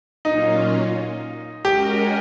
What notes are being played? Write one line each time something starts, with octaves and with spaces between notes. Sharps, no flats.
A#2 F#3 A#3 C#4 D#4 F4
G#3 C#4 F#4 G4 A#4 D#5